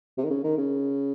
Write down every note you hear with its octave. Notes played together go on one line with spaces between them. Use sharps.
C3
D#3
C#3
D#3
C#3